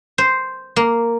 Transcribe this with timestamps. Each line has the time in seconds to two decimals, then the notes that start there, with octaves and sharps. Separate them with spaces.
0.18 C5
0.76 A#3